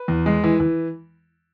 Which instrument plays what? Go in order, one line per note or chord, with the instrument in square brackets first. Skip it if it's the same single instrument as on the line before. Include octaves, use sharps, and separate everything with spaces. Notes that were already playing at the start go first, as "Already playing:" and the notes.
Already playing: [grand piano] B4
E2
G#3
E3
E3